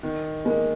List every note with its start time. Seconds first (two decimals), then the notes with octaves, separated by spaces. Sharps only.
0.03 D#3
0.45 G#3 A#3